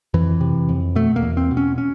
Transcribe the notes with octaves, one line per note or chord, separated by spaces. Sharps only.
F2 E3
C3
F2
B2 A3
A#3
E2
C4
B2
C#4
C#4